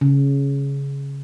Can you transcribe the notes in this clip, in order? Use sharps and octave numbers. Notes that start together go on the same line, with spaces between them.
C#3